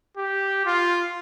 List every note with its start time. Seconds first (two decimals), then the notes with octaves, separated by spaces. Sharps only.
0.17 G4
0.66 F4